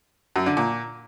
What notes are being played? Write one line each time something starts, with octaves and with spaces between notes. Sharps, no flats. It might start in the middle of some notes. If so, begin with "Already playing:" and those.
F#2
D3
A#2